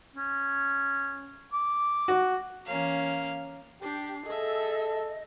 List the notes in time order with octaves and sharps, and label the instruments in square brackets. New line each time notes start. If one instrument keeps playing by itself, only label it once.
[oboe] C#4
D6
[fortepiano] F#4
[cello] E3 C#4 [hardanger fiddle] A#3 F5
[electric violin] D4 C7 [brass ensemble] G4
[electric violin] G#4 E5 [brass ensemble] A4 [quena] D#5